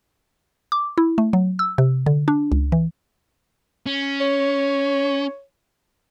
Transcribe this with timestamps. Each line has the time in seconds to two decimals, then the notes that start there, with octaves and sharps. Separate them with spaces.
0.72 D6
0.98 E4
1.18 A3
1.33 F#3
1.59 E6
1.78 C3
2.06 D3
2.28 D4
2.52 C#2
2.72 E3
3.86 C#4
4.21 C#5